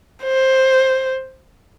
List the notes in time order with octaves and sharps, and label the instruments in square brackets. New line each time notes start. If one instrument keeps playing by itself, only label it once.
[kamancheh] C5